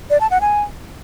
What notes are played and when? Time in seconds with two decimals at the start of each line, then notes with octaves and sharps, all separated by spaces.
0.10 D5
0.21 A5
0.31 F#5
0.41 G#5